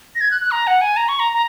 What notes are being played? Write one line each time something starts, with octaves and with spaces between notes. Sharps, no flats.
A#6
G#6
F#6
F#6
A#5
F#5
G#5
A#5
C#6
A#5
A#5